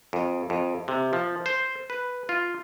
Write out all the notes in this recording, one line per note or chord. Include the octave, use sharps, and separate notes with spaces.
F2
F2
C3
F3
C5
B4
F4